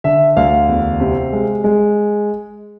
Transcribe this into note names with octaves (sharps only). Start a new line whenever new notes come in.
D3 E5
D2 F5
E2
C3
G#3
G#3